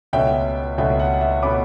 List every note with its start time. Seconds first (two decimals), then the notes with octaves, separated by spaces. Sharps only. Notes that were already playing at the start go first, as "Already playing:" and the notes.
0.13 C#2 B2 A3 C#4 E5 G5
0.78 C#2 B2 A3 C#4 E5 G5
1.00 F#5
1.21 E5
1.42 B2 A3 C#4 B5 D6